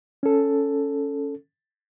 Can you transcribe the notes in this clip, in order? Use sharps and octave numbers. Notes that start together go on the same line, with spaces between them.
C#4 A4